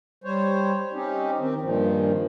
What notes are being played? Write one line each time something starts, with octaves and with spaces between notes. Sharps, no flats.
G3 C5 C#5
C4 C#4 D#4 G4
D#3 C4
G2 A#2 D#3 F3